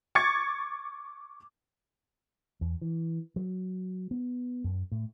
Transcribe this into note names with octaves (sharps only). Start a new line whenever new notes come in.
C#6 D6 G#6 A6 C#7
E2
E3
F#3
B3
F#2
A2